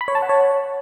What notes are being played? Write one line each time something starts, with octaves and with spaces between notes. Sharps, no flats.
B5
C#5
A5
F#5
C#5